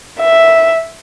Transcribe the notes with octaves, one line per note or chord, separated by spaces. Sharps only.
E5